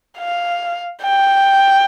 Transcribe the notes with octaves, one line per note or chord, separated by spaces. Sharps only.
F5
G5